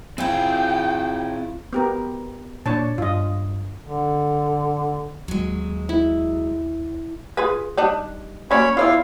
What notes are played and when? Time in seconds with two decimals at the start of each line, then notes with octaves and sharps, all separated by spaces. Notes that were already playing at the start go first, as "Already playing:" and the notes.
0.18 C4 E4 F4 G#4 G5
1.73 B3 G4 A#4
2.66 A#2 D4 C#5 A5
2.98 G2 F4 D#5
3.86 D3
5.28 D#2 F#3 G#3
5.89 E4
7.37 F4 G#4 B4
7.77 G3 D4 D#4
8.51 F#3 A#3 C#4 C#5 D5 B5
8.77 B3 E4 F4 C#5 D5 F5